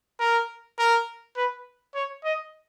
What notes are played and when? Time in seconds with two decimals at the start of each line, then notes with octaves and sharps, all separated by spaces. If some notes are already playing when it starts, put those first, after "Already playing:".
0.20 A#4
0.78 A#4
1.37 B4
1.95 C#5
2.24 D#5